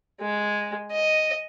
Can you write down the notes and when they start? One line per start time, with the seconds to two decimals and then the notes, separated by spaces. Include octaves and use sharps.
0.21 G#3
0.91 D#5